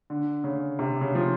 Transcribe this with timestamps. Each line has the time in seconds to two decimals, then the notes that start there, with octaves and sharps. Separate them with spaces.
0.10 D3
0.44 C#3
0.79 C3
1.01 C#3
1.15 F3